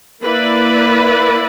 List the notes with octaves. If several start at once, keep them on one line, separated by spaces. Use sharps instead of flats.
A#3 E4 B4 D5